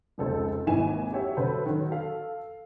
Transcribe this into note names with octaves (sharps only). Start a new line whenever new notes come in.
F1 C#2 A4 C5
G#1 D#2 D#3 E3 G#5 E7
F#4 G4 C#5 E5
D3 F#3 A4 B4 C5
D#3 F#3
A4 F5